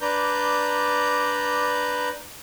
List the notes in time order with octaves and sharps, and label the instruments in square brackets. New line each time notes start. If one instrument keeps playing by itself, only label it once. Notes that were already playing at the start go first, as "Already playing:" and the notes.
[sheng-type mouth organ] D4 B4 D5 A#5 G6